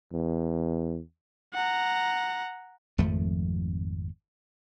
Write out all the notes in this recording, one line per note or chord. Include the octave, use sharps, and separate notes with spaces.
E2
F#5 A#5
G#1 F2 F3 A3